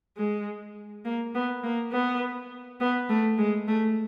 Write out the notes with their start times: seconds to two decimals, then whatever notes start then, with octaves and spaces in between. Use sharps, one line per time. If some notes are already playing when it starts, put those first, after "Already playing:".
0.17 G#3
1.05 A#3
1.34 B3
1.63 A#3
1.92 B3
2.80 B3
3.09 A3
3.38 G#3
3.68 A3